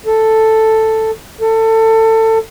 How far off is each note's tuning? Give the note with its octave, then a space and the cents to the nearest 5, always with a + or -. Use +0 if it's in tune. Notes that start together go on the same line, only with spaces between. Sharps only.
A4 +5
A4 +25